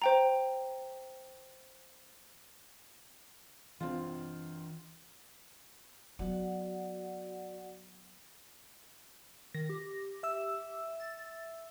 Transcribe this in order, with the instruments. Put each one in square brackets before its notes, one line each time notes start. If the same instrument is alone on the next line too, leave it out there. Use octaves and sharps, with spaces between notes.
[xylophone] C5 G5 A#5
[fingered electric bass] E3 D4 [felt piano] C4 F4
[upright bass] F#3 B3 [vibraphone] F#4 D5 F#5
[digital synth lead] D#3 [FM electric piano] A#6
[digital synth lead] G4
[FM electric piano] E5 E6
[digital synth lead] A6